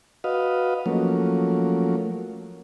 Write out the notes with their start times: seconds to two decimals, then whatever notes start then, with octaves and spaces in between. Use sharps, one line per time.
0.24 F#4 B4 D#5 F5
0.86 F3 F#3 A3 A#3 C#4